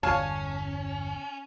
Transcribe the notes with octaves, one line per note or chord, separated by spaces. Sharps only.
G1 E2 C#4 C#5 F5 G#5 A5